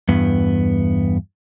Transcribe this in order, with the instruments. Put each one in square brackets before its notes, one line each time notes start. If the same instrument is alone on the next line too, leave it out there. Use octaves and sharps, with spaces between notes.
[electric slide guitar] E2 G2 B3